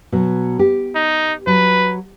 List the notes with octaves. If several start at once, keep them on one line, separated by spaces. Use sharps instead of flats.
B2 F#3
G4
D#4
F#3 B4